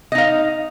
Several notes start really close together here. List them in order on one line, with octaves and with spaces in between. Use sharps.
D#5 D#4 F5